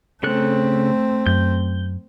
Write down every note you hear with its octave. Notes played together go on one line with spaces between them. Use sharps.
C#3 A3 C4 A4 F#6
F#2 G6